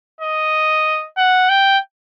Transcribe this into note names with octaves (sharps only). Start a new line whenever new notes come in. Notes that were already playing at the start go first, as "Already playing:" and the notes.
D#5
F#5
G5